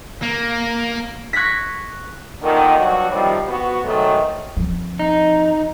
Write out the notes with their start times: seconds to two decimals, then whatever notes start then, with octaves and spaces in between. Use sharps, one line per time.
0.22 A#3
1.33 C#6 F#6 G#6 A#6 B6
2.41 A#2 D3 D#3
2.77 G2 F#3 F#4
3.11 C3 D#3 F3 G3
3.47 B3 F#4
3.83 G#2 B2 D#3 F#3 A3
4.57 F3 C4
4.99 D#4